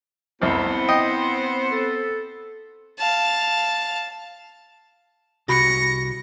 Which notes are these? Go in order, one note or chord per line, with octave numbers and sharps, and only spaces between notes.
C2 F2 B3 C4 E4 C5
D#5 G5
A4
F5 A5
C2 F#4 B5 A#6 C#7